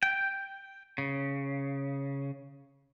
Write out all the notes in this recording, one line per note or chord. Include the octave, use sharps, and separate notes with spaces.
G5
C#3